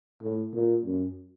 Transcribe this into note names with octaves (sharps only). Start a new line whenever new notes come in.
A2
A#2
F#2